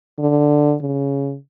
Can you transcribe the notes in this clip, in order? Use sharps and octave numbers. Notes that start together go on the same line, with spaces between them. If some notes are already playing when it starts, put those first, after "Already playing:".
D3
C#3